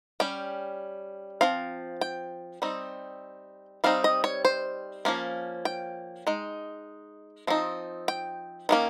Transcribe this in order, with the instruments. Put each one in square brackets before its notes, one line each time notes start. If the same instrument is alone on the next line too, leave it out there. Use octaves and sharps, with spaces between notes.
[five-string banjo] G3 C#4 G5
F3 C4 F5
G5
G3 C4 D#4
G3 C4 D#4 F5
D#5
C#5
C5
F3 A#3 C#4
G5
G#3 D#4
F3 C4 D#4
G5
D#3 G3 A#3 C#4